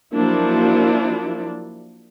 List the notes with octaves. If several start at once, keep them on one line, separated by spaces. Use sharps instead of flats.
F3 F#3 A#3 D4 E4